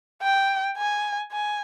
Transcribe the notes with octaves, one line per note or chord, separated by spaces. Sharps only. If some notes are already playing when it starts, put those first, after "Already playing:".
G5
G#5
G#5